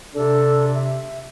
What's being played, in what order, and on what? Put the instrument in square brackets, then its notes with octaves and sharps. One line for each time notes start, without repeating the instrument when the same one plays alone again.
[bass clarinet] C3 [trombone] D4 [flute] A4
[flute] E5